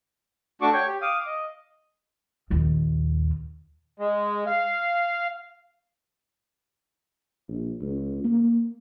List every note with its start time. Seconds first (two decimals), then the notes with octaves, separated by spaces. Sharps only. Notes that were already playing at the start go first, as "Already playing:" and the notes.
0.62 A3 D4 F#4 C#6 D6
0.73 C#5 G5 C#6
0.86 G4
1.02 F5 D6 D#6
1.26 D#5
2.50 A#1 D#2
4.00 G#3
4.47 F5
7.48 A#1
7.81 C#2
8.24 A#3